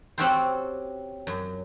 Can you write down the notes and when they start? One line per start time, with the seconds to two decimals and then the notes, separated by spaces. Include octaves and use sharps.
0.18 C4 C#4 F#4 G4 A4 C5
1.27 F#2